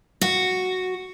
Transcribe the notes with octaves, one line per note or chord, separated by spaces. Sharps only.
F#4